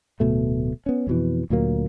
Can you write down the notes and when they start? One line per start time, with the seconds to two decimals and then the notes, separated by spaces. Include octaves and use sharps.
0.20 D1 B2 A3
0.86 B3 C#4
1.07 F2 B2 E3
1.50 D2 A#2 F#3 A#3